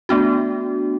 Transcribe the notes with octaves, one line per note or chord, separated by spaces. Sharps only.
A3 B3 D4 F#4